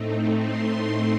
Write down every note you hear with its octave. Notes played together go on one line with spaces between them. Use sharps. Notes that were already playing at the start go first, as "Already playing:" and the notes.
Already playing: A2 A3 C4 D#4
C6